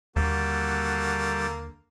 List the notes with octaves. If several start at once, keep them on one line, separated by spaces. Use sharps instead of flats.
D#2 D3 G3 A#3 F#4 A4